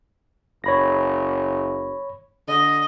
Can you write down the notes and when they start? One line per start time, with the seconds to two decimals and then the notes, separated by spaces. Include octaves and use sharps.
0.64 F#1 C#5 B5 A#6
2.48 D3 D#5